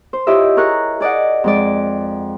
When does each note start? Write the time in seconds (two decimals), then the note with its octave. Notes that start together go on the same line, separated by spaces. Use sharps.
0.13 C5
0.27 E4 F4 G4 C#5 D#5 E5
0.57 G#4 A#4 C#6 F#6
1.00 G#4 D5 D#5 F#5
1.44 F2 G#3 D5